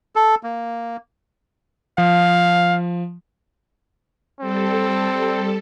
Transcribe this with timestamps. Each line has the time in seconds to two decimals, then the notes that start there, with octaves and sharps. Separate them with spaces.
0.16 A4
0.43 A#3
1.98 F3 F5
4.41 G3 C4 A4